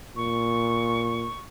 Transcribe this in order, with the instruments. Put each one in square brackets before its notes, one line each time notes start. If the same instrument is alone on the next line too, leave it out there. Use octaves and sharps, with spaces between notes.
[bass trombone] A#2 [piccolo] C#6